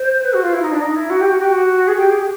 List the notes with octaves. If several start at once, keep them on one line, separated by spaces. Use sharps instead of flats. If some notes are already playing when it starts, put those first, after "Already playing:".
Already playing: C5
B4
F#4
F4
E4
D#4
D4
D#4
E4
F#4
G4
F#4
G4
F#4
G#4
G4
G#4
G4